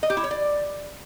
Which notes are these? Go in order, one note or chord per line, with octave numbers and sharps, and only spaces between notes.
D#5
G4
E4
C#5
D5